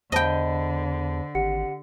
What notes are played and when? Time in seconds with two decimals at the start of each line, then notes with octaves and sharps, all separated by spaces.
0.12 E2 D3 C5 D#5 G5 A5 B5
1.35 G#1 G4 F#5 C#7